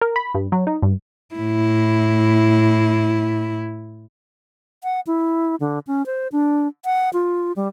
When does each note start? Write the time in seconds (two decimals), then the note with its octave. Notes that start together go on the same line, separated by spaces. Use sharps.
0.01 A#4
0.16 B5
0.35 G2
0.52 F#3
0.67 D#4
0.83 G2
1.35 A2 E4
4.84 F#5
5.07 E4
5.60 D3
5.87 C#4
6.06 C5
6.32 D4
6.85 F#5
7.13 F4
7.56 G3